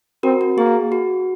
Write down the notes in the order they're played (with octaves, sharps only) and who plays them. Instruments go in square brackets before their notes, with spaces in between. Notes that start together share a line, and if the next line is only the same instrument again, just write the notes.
[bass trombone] C4 [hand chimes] F#4 A#4
[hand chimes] F#4
[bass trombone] A#3 [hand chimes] G#4
[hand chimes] F#4